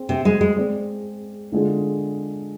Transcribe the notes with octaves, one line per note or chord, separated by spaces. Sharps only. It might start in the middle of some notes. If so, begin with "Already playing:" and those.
Already playing: C4 G#4 C5
C3
G#3
G#3
G#3 C4 G#4 D5
D3 G#3 D4 F4 G#4